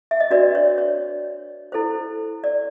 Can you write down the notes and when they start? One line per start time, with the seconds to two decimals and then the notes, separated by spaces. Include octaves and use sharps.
0.11 E5
0.20 D#5
0.31 D4 F#4 B4 D5
0.55 C#5
0.78 C#5
1.72 E4 A4 C5
2.44 D5